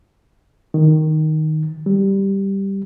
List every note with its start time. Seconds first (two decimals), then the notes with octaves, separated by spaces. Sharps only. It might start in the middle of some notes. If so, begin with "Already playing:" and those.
0.74 D#3
1.86 G3